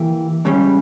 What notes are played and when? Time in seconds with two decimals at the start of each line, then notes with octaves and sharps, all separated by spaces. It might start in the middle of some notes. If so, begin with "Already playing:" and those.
Already playing: E3 A#3 E4 G4 A#4
0.45 C#2 C#3 G3 C#4